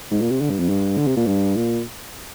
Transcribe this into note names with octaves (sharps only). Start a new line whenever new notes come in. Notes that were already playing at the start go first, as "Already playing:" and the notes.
G#2
A#2
C3
D3
G2
F2
G2
D3
C3
A#2
G2
A#2